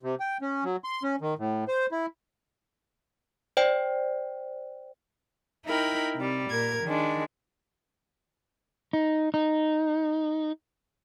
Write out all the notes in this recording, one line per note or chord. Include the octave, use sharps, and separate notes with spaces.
C3
G5
C#4
F#3
C6
C#4
D#3
A2
C5
E4
C5 D5 G5
D#4 E4 A#4 G5 B5
C3 G3
A#2 A#4 G#6
D#3 G#3 D4
D#4
D#4